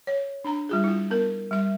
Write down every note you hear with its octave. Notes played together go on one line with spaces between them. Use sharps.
C#5
D4 A#5
G3 F4 G#4
E4 F4
B3 A#4
G3 E5